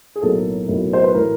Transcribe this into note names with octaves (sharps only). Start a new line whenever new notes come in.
G#4
B1 A2 F#3 A#3 A4
B1 A2 F#3 A#3
C5
B4
A2 E3 A#4